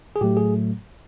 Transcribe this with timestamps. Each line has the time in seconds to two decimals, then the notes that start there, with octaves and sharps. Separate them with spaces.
0.16 G#4
0.21 A2 F#3 A3 G4
0.37 G#4